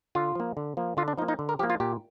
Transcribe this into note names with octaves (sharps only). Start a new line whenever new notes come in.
D3 F4
F3 A#3
D3
F3 A#3
D3 F4
D4
F3 A#3 D#4
D#4
D3
A#4
F3 A#3 G4
F4
A#2 G4